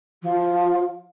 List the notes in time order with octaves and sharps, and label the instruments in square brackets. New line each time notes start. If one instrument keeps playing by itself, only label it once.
[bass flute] F3